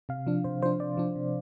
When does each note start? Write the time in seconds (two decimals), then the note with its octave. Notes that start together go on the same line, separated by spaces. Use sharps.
0.09 C3 F5
0.27 F3 D4
0.44 C3 C5
0.62 F3 D4 C5
0.79 C3 D5
0.97 F3 D4
1.16 C3